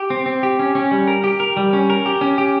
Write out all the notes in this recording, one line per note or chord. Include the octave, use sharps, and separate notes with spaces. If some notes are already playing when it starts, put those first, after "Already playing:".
Already playing: G4
C4
C4
G4
C#4
C#4
G3
A#4
G4
A#4
G3
C#4
A#4
G4
C#4
G4